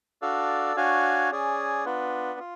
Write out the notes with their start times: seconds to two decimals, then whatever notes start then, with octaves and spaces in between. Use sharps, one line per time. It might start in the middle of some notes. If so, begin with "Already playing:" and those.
0.22 D4 F#4 A4 D5 F5
0.76 D4 F#4 C#5 F5 G#5
1.31 C#4 G#4 D5 G#5
1.85 B3 D4 F4 B4
2.39 F4